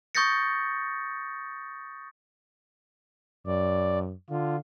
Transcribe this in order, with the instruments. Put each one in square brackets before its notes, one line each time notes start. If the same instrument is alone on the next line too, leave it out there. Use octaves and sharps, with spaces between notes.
[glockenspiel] C#6 D#6 G6 A6 A#6 C#7
[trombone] F#2 [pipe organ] D5
[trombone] D3 [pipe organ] F4